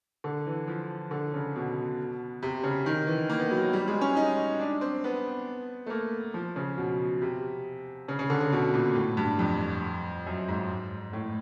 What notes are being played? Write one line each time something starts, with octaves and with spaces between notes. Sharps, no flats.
D3
E3
F3
D3
C#3
B2
C3
C#3
D#3
E3
A#3
B3
F#3
F#3
G3
G#3
C#4
D#4
D4
C4
B3
A3
A#3
F3
C#3
B2
C3
C#3
C#3
D3
C#3
B2
A#2
A2
G2
F2
F#2
G#2
A2